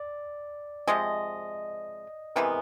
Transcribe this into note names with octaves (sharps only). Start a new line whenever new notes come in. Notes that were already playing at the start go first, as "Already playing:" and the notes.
Already playing: D5
C3 F3 G#3 D#5
C3 E3 G#3 B3 A#4